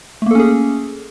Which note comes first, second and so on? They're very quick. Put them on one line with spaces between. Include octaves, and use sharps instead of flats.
A3 A#3 A4 C#4 G#4